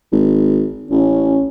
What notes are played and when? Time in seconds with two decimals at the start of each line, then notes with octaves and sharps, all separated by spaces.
0.12 G#1
0.90 A1 C#4